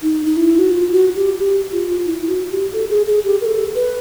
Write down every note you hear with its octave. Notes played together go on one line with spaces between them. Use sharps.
D#4
D#4
E4
F#4
F4
F#4
G4
G4
F4
E4
F#4
G4
A4
G#4
G#4
G4
A#4
A4
B4